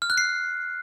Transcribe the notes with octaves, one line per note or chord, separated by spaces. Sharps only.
F6
F#6
C7